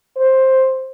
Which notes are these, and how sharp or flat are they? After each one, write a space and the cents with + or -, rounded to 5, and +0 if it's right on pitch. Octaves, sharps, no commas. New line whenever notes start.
C5 +10